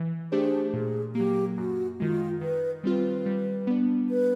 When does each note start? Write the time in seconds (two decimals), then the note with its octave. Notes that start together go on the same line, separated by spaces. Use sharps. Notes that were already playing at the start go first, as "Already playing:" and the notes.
Already playing: E3
0.32 A3 D4 G4 G#4 C5
0.73 A#2 G#4
1.15 F#3 A#3 G4
1.57 F#2 F#4
1.99 D#3 G#3 F4
2.41 D#3 B4
2.84 G3 C4 F4 B4
3.26 G3
3.67 B3 D4
4.10 B4